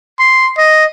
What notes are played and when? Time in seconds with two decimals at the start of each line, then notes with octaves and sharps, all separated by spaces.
0.19 C6
0.58 D#5